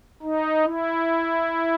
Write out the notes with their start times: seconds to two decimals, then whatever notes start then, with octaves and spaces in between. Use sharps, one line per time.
0.22 D#4
0.63 E4